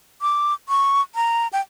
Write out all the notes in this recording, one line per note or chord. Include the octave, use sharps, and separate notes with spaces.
D6
C#6
A#5
G5